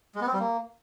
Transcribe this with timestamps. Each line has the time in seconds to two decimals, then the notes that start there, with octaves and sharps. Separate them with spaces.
0.15 G#3
0.21 B3
0.27 C4
0.33 G3
0.39 A#3